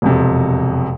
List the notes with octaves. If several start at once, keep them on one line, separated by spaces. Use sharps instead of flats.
E1 F2 C3